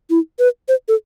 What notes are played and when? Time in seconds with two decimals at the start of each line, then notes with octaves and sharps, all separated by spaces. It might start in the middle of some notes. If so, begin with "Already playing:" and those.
0.10 E4
0.39 B4
0.68 C5
0.88 A4